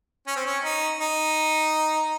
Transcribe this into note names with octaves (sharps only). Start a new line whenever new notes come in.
C#4
C4
C#4
D#4
D#4